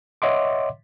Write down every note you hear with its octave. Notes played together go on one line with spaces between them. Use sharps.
C#5 D#5 E5 F#5 C6 D6